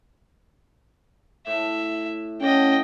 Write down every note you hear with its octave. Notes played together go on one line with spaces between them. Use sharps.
A2 E5
A2 C#4 D5 D#5 F#5 G5